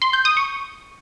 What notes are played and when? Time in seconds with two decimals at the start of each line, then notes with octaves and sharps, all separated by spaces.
0.02 C6
0.13 G6
0.25 D#6
0.37 C#6